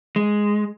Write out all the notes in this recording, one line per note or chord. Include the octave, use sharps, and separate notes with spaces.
G#3